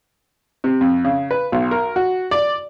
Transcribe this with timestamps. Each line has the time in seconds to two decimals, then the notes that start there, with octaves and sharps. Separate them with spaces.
0.64 C3
0.81 F2
1.05 C#3
1.31 B4
1.52 B1
1.71 A#4
1.96 F#4
2.31 D5